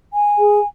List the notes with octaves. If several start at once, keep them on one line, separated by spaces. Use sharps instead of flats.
G#5
G#4